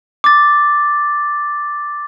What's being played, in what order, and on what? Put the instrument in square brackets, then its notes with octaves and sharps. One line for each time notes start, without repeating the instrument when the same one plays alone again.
[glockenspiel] D6 A6